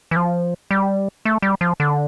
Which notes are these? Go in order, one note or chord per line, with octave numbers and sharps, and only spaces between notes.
E3
F3
G3
A3
G3
F3
D3